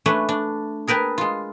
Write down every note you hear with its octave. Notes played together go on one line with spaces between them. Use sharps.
A3 C#4 D4 B4 E5
D4
G#4 A#4 B4 G5 A5
G#3 F4